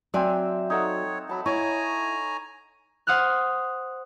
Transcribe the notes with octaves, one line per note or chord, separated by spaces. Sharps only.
F#3 C4 D5 E5 G#5
D#4 A4 C#5 F#5
F#3 A5 B5
E4 C#5 G#5 A#5
C5 F#5 D#6 F6 F#6